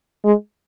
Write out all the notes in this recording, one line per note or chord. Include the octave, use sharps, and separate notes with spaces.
G#3